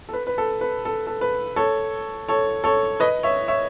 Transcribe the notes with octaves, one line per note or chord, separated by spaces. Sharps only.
A4
B4
B4
A4
B4
A4
A4
B4
A4 C#5
A4 C#5
A4 C#5
B4 D#5
C#5 E5
C#5 E5